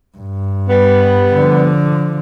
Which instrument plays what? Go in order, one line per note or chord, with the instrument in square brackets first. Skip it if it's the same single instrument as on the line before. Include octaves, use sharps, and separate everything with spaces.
[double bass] G2
[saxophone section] G3 B3
[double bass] D3 F3